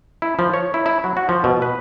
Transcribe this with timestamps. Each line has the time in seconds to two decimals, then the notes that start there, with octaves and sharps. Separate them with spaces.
0.22 E4
0.39 F3
0.54 C#5
0.74 E4
0.86 E4
1.04 F#3
1.17 F#4
1.29 F3
1.44 B2
1.62 B4